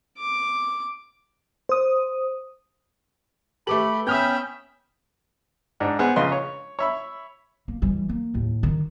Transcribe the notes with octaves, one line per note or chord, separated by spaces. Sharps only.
D6
C5 D#6
A3 G4 A4 B4 B5 D6 F#7
B3 C#4 E5 G5 B5 D#6 F6 G6
G#2 D4 F#5
B3 G#4 C5 F#5
A#1 C#3 D#4 B4 C6
C#5
C#5 E5 B5
A#3
E3 G3
A#3
D#2 A2
D#3